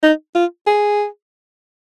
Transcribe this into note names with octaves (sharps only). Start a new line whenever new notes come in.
D#4
F4
G#4